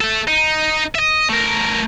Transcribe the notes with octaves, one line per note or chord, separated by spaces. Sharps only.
A3 A4
D#4
D#5 E5
A3 A#4